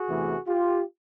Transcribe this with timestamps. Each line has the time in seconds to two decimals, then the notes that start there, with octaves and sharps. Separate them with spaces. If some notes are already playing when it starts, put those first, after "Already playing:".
Already playing: F#4 G#4
0.08 E2 C3 E3 A3
0.48 F4 G4